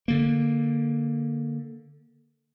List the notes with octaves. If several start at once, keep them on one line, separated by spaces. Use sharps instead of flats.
D3 A#3